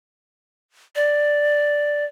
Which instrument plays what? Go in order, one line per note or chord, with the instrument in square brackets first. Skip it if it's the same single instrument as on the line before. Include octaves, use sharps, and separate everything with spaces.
[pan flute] D5